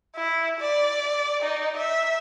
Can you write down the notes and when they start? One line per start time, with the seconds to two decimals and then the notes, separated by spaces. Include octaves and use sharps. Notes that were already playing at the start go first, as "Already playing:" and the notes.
0.16 E4
0.60 D5
1.42 D#4
1.77 E5